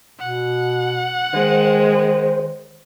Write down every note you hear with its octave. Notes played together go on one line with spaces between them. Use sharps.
B2 F#5
D#3 G#3 C5